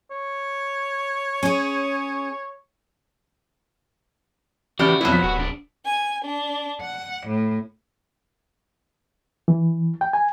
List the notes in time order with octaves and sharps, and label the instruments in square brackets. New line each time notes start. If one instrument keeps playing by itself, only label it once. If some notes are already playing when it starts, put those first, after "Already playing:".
[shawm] C#5
[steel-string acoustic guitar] C#4 G#4
[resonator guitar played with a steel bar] A2 G4 [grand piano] C#3 D5 F6 [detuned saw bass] E3 [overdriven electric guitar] F#4
[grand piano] F2 B2 G3 [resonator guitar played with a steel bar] F#3 B3 [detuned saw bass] E4
[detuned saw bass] F3 [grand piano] B6
[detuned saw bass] D1 [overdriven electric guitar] F#4 F#5
[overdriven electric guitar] B1 D4
[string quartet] G#5
D4
F#5
A2
[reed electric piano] E3
G5
G#5